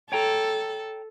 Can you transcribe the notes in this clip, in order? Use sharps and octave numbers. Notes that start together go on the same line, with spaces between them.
A4 C#5 G5 A#5